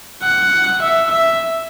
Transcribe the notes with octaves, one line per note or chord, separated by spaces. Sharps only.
F#5
E5
E5